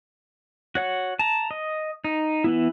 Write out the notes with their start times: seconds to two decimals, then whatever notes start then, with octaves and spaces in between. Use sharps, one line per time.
0.75 F#4 C#5 F#5
1.19 A5 A#5
1.51 D#5
2.04 D#4
2.44 E3 B3 E4